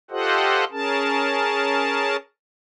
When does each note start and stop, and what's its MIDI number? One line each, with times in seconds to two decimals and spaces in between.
0.11 0.64 65
0.11 0.64 67
0.11 0.64 69
0.11 0.64 72
0.11 0.64 75
0.11 0.64 78
0.72 2.16 61
0.72 2.16 68
0.72 2.16 70
0.72 2.16 81